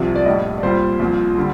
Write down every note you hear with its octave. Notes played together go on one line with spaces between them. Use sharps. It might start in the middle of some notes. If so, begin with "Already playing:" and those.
Already playing: C2 C3 F3
D5
A#1 A2 G3 D#5
D5
C2 A#2 G3 C5
C2 A#2 F3
D3 G3